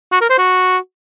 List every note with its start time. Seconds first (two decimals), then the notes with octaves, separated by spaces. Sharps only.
0.12 F#4
0.21 A#4
0.30 C5
0.39 F#4